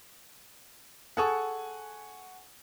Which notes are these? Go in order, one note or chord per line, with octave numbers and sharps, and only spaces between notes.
G#4 A4 F#5 G#5 C#6